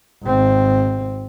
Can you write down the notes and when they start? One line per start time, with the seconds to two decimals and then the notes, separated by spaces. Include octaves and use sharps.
0.23 G#1 C4